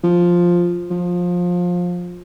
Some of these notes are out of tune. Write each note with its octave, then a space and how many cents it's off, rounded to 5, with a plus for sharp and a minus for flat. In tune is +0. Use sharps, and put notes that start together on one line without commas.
F3 +5
F3 +20